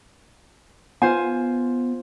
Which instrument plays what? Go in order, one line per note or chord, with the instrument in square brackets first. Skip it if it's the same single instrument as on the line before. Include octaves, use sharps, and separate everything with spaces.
[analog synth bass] B3 [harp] F4 C5 G#5